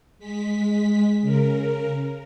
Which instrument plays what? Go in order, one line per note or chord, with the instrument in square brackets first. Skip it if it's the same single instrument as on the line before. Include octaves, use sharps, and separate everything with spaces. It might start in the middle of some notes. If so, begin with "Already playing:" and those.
[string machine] G#3 B6
C#3 A#4